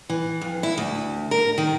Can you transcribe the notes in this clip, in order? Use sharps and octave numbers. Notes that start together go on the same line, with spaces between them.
E3
F2
E4
D2
A#4
D#3